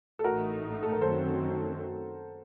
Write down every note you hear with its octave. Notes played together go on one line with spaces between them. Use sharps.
A4
A1 A2 A3 D#4 F#4 A#4
A4
A#4
F#2 D#3 F#3 A3 C4 A4 C5